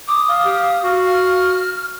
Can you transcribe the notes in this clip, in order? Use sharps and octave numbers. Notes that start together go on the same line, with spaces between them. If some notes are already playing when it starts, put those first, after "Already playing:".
D6 D#6
F5
G4
F#4
F6